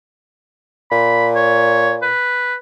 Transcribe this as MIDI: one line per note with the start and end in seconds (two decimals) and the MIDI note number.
0.91 2.12 46
0.91 1.28 83
1.36 1.95 73
2.02 2.56 71